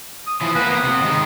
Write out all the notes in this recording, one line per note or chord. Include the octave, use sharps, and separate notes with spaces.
D#6
E3 F3
A#3 B3 B4
D#6
C3
D#3 G#3